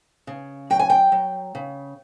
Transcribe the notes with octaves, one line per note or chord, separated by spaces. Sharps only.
C#3
F#3 G5
G#5
G5
F#3
C#3